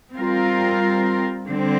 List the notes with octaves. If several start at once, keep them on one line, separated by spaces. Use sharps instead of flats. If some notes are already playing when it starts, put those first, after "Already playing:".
G3 C4 F4 A#4
D3 G3 C4